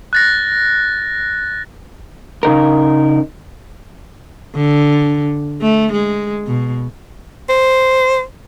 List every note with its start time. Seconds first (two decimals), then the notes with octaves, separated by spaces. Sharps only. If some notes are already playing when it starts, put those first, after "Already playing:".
0.13 F#6 A6 A#6
2.43 C#3 D#4 A#4
4.56 D3
5.61 A3
5.93 G#3
6.47 B2
7.49 C5